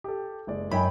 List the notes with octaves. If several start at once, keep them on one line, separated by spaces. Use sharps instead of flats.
G4 A4
F#1 G#3 D5
F#2 D#4 G5 G#5 B5